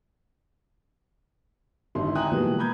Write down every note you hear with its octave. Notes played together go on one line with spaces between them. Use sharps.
G#1 D3 D#4 E4 C6
E5 G5 G#5 A#5 D#6 F#6
B2 E3 F3 G3 G#3 A#3
A#5 B5 D#6 G6 G#6